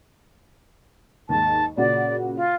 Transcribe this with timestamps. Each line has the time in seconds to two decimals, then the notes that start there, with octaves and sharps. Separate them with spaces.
1.29 D#2 G#2 A5
1.77 A#2 C#3 F#4 D5
2.36 F4